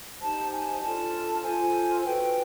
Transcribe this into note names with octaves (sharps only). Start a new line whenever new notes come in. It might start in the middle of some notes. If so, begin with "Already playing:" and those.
D#4 G4 C5 A5
G#5
D4 F4 A4 A5
F4 A4 C5 G#5
D4 F#4 B4 G5